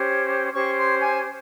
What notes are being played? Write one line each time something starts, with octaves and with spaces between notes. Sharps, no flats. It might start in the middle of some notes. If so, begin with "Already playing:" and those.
Already playing: C#4 G4 C5
C#4 G4 C5 C#6
C6
G#5